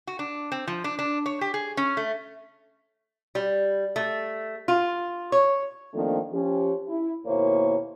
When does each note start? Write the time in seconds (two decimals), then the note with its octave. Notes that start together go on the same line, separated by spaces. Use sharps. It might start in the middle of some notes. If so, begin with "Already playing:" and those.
0.07 F#4
0.19 D4
0.52 C4
0.67 F3
0.84 D4
0.99 D4
1.26 C#5
1.41 G4
1.54 G#4
1.77 C#4
1.97 A3
3.35 G3
3.96 A3
4.68 F4
5.32 C#5
5.94 D#3 F3 A3 A#3 C4 D4
6.33 F3 C#4 G4
6.88 E4
7.26 D#2 B2 A#3 E4 C5 C#5